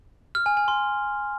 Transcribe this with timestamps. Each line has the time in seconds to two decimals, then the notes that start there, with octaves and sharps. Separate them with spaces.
0.35 F6
0.46 G#5
0.57 G#5
0.68 C6